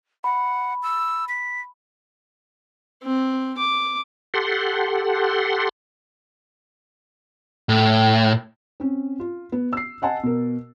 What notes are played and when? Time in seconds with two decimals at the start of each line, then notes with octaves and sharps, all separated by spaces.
0.24 F#5 B5
0.83 E6
1.29 B6
3.03 C4
3.58 D6
4.34 G4 A4 F#5 C6
7.69 A2
8.80 C4 C#4
9.20 F4
9.52 B3
9.73 E6 C7
10.02 D#5 F#5 G#5 A5
10.23 B2 A#4